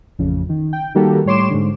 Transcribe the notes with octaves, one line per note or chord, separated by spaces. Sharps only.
A1 F2 C#3
D#3
G5
D#3 G3 A#3 F#4 G4 A4
A2 G3 C#5 C6 D6 E7
G#2 D3